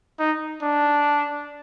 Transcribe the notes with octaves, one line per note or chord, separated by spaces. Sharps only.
D#4
D4